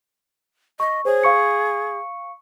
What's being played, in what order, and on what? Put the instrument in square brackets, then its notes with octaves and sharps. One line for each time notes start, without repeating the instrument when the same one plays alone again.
[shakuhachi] D#5 [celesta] C#6
[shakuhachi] G#4 [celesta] C5 C#5
[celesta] F5 C#6 C#7